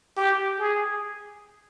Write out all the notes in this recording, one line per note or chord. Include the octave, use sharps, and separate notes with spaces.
G4
G#4